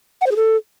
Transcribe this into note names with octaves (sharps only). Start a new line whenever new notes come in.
F#5
C5
G#4
A4